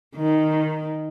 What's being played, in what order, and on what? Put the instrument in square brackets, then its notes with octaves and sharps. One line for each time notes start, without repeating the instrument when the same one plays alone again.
[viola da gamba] D#3